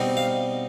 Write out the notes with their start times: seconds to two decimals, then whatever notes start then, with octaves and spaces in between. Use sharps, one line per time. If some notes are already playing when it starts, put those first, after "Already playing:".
Already playing: B2 G3 C4 D#4
0.17 F5